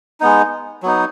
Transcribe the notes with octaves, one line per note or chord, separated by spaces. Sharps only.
G#3 B3 D#4
F#3 B3 D#4